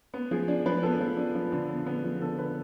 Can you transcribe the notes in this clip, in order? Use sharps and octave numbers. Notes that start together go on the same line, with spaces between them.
B3
F3 G#4
D4
F3 B4
B3 A4
F3
D4
F3
D3
B3
B3
F3
D3 A4
D3 B4